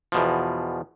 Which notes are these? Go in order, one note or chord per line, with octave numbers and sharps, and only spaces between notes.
E2 B2 F3